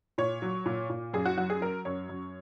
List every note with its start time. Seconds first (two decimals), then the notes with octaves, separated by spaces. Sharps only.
0.18 A#2 C#5
0.42 F#3
0.66 A#2
0.89 A#2
1.14 F#2 G#4
1.25 F#4
1.37 F#3 F#4
1.50 G#4
1.61 F#3 A#4
1.85 F#2 C#5
2.09 F#2